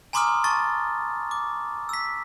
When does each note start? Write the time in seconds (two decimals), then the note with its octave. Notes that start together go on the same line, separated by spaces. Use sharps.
0.13 G#5 A#5 C6 D6 D#6 F6
0.44 A5 C#6 A6
1.31 D6
1.89 E6 B6